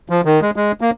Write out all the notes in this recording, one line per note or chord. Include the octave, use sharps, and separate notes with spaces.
F3
D#3
G#3
G#3
A#3